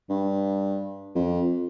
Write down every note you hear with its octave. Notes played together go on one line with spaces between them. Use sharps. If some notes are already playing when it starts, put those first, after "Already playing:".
G2
F2